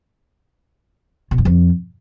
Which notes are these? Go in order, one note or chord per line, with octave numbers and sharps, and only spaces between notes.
B2
F#2
F2